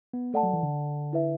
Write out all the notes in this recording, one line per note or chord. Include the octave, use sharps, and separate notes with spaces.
B3
A3 A4 D5 F#5 A5
F#3
E3
D3
E4 B4 E5